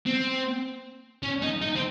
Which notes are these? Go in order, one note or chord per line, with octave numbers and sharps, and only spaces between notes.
C4
C#4
D#4
D#4
C4